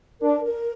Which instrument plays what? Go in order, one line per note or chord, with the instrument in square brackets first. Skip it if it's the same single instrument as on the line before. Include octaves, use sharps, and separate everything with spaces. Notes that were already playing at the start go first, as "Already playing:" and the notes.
[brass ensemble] D4 [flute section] A#4
[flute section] A#4